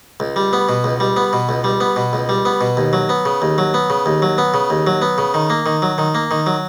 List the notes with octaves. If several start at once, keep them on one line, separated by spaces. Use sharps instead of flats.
C#2
G3
B3
B2
C#2
G3
B3
B2
C#2
G3
B3
B2
C#2
G3
B3
B2
D#2
F#3
B3
C#3
D#2
F#3
B3
C#3
D#2
F#3
B3
C#3
D#2
F#3
B3
C#3
D#3
A#3
D#3
F#3
D#3
A#3
D#3
F#3